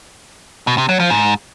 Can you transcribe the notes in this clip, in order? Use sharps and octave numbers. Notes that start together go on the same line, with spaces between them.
B2
C3
F#3
F3
G#2